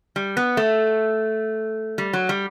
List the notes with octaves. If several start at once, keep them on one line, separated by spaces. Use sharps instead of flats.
G3
B3
A3
G3
F#3
G3